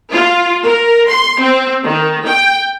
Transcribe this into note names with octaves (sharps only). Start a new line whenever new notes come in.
F4
A#4
C6
C4
D#3
G5